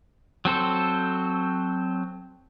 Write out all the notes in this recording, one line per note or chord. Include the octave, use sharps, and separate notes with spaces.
F#3 C4 A4 C5